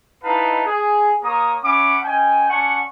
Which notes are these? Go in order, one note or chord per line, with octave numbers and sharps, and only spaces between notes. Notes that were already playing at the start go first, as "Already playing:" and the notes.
D#4 E4 B4 D#5 F5 A5
G#4
A#3 C#5 A#5 D#6
C#4 E5 F#5 B5 D6
C#4 D#5 G5 G#5
C#4 D5 F#5 G#5 A5 C#6